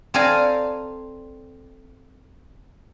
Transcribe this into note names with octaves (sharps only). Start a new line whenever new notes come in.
C4 A4 D5 F5 G#5 A#5